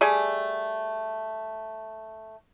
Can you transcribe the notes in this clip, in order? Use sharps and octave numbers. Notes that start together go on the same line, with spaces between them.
G3 A3 G#4 G#5